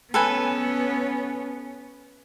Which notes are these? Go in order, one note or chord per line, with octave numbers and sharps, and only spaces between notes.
B3 C#4 A4 B4 G#5